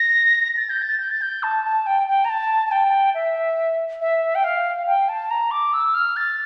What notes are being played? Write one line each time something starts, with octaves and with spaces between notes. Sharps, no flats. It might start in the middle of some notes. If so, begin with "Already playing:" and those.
Already playing: A#6
A6
G6
A6
G6
A6
G6
A5
A5
G5
G5
A#5
A5
A5
G5
E5
E5
G5
F5
G5
A5
A#5
D6
E6
F6
A6